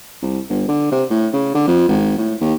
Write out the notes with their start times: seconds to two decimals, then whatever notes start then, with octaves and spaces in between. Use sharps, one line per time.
0.22 C2
0.50 G1
0.69 D3
0.92 C3
1.10 A2
1.33 C#3
1.55 D3
1.67 F2
1.88 G#1
2.18 A2
2.41 D#2